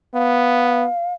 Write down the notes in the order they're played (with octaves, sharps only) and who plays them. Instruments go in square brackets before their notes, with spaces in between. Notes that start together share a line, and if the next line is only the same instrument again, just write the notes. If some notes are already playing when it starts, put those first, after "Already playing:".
[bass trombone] B3 [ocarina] F5